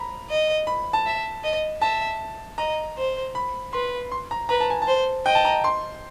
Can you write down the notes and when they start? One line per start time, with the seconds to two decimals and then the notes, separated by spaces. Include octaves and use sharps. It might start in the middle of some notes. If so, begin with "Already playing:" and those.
Already playing: A#5 B5
0.30 D#5
0.67 B5
0.93 A5
1.06 E5
1.44 D#5
1.82 E5 A5
2.58 D#5 A#5
2.97 C5
3.35 B5
3.73 B4 C6
4.12 C6
4.31 A#5
4.49 B4 A#5
4.61 A5
4.70 G#5
4.82 A5
4.87 C5
5.26 D#5 G5
5.35 A5
5.45 A#5
5.64 C6